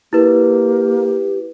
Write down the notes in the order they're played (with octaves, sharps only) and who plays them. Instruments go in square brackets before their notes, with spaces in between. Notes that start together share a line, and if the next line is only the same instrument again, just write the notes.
[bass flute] A#3 [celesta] E4 B4 [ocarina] G4